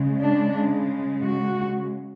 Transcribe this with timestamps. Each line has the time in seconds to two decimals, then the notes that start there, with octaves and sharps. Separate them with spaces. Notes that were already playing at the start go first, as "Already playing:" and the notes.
Already playing: C#3 G#3
0.22 D4
1.24 F#4